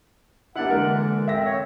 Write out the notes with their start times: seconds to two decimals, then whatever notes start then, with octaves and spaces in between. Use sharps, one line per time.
0.55 A#3 D4 E4 G4 D5 F#5
0.71 D3 E3 G#3 A#4
1.28 C4 E5 A#6
1.45 C#5